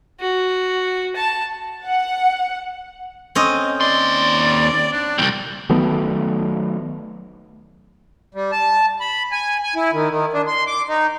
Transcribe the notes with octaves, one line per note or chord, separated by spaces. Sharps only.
F#4
A5
F#5
C4 C#4 D#5
D#2 D5 C6
D4
C2 F2 G5
D#3 F#3 A3 B3
G3
A5
B5
G#5
G#5
E4
D#3
D#3
D4
C6
D6
D#4